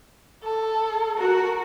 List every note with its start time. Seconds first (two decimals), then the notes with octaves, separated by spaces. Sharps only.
0.44 A4
1.18 F#4 A#4